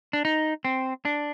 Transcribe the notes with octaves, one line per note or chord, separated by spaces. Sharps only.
D4
D#4
C4
D4